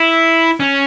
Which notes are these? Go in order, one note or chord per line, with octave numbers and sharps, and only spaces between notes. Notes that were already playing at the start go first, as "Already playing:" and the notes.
Already playing: E4
C#4